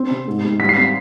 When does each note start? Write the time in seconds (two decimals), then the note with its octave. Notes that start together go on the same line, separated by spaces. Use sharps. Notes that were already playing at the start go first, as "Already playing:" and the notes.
Already playing: C4
0.10 C3
0.27 G#2
0.44 G#2
0.60 G3 B6
0.69 C7
0.77 C4 B6